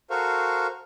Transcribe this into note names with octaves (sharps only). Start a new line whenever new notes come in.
F#4 A4 A#4 C5 F5 C#6